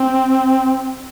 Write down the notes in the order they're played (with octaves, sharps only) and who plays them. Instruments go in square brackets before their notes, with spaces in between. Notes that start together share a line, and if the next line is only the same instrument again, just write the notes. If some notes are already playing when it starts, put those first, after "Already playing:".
Already playing: [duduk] C4